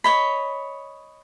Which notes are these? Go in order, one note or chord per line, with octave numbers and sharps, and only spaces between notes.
C#5 D#5 B5